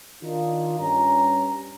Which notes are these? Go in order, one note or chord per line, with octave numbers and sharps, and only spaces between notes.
D#3 D4 D#4 F4
G2 C#4 A#5